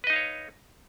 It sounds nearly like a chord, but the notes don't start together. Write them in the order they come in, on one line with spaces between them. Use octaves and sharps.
B4 D#5 D#4 F5 C#5